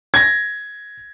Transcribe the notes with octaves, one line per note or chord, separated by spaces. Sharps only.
G#6 A#6